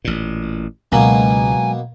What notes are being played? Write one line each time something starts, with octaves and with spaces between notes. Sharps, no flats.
A1 A#2
C#2 B2 F#3 G#3 A#3 G#5